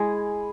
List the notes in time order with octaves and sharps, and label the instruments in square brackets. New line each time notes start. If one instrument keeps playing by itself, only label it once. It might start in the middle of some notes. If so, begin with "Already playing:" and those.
Already playing: [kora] G#3 [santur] E4 G#4